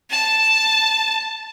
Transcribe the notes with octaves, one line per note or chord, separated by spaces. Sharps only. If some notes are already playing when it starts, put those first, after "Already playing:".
A5